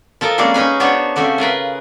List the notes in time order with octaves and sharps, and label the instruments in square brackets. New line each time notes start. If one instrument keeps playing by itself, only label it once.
[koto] F3 A4 A#4 D#5
G3 G#3 A#3 C4 C#4 G#4
C#4 D#4 B4 G#5
B3 D4 D#4 F#4 C5 C#5
C#3 A3 C4 F#4 G4
F4 G#4 A#4 B4